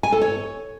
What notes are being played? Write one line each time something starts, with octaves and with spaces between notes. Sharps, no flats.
G#5
A4
C#5